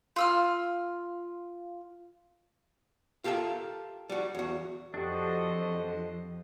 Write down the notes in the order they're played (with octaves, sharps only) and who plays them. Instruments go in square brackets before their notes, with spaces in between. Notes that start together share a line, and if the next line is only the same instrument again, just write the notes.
[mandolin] F4 E6 F6
[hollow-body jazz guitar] F4 G4 A4 A#4 E5
G3 F#4
E2 F#4
[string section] F2 [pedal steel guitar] D4 F#4 [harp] G4 [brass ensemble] A4 C5 D#5